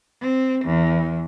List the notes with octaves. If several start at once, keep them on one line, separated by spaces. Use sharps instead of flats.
C4
E2